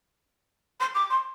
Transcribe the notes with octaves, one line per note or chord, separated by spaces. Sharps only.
C6
D6
C6